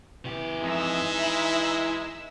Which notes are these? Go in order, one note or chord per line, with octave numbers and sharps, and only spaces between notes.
C#3 E3 G4
F2 G#3 D#4 E5 E6
E4 B5